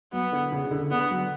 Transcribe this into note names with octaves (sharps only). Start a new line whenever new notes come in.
F#3 B3
D3
C#3
D3
D3 B3
F#3